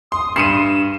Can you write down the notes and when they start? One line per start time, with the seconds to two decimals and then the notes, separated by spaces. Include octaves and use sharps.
0.12 C6 D#6
0.36 G2 C7 C#7 D#7 E7